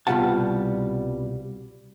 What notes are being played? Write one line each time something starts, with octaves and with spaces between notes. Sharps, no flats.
C2 B2 G3 F4 F#5 A5